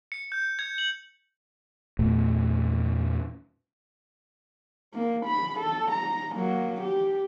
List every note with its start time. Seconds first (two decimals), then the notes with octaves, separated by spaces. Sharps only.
0.12 C#7
0.32 G6
0.59 G#6
0.78 F#7
1.99 E2 A#2 A3
4.94 A#3
5.26 B5
5.60 A4
5.91 A#5
6.36 F#3 A#3
6.81 G4